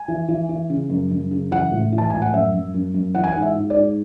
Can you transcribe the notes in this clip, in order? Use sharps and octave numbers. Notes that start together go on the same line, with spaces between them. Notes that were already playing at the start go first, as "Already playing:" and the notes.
Already playing: G#5
E3
E3
E3
C#3
F#2
F#2
C#3
E3 F#5
A2
E3
A5
A2 G#5
F#5
F#2 E5
F#2
F#2
F#2
E3 F#5
G#5
F#5
G#2
E5
G#2
D5
G#2